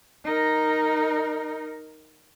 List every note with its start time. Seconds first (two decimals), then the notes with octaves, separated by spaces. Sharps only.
0.24 D#4 A#4